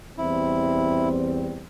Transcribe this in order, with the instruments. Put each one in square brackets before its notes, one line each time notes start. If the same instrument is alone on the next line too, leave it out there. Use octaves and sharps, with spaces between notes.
[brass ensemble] E2 G3 C4 [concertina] E4